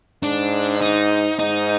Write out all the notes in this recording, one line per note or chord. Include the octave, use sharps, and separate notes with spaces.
G#2 D4
D#4
G#2 D#4